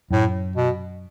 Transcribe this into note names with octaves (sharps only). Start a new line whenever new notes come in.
F#2 A2
B2